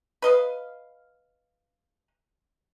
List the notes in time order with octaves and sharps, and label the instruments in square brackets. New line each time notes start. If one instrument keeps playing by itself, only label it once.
[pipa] B4 D#5 F5